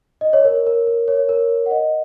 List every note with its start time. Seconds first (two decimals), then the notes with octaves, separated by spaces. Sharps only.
0.21 D#5
0.33 C#5
0.45 A#4
0.56 C#5
0.66 A#4
0.87 A#4
1.08 C#5
1.29 A#4
1.66 F#5
1.71 D#5